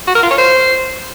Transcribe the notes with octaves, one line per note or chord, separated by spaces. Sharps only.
F#4
A#4
F4
C#5
C5